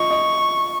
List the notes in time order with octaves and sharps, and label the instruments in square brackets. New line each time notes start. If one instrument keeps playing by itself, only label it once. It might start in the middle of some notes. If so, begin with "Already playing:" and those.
Already playing: [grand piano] F4 D#5 [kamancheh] C#6
[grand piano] D#5